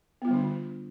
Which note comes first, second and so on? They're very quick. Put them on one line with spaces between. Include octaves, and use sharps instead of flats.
B3 F4 G3 D3 D4